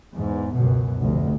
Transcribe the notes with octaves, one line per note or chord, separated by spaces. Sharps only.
E2 G#2
C#2 F#2 B2
F1 D2